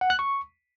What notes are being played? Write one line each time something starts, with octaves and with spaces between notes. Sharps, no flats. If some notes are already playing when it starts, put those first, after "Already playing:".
F#5
F#6
C#6